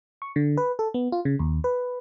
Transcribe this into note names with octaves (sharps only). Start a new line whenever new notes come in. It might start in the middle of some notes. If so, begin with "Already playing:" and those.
C#6
D3
B4
A4
B3
F4
C#3
D#2
B4